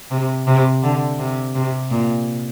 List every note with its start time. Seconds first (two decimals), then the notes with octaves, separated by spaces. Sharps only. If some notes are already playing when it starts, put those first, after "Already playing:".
0.11 C3
0.47 C3
0.83 D3
1.19 C3
1.55 C3
1.91 A#2